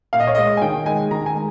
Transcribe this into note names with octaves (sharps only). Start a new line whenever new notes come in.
A#2 F5
D#5
C#5
G#3 D#5
G#5
D#3 G5
G#3 G#5
D#3 A#5
G#5
G#3